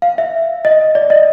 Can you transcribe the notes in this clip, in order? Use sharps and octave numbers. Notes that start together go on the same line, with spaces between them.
F5
E5
D#5
D5
D#5